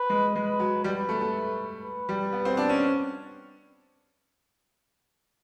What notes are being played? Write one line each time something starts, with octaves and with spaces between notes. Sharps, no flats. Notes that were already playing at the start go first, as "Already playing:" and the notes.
Already playing: B4
G#3
G#3 B4
F#3
G3 B4
A3
A3
B4
G3
B3
C4
D4
C#4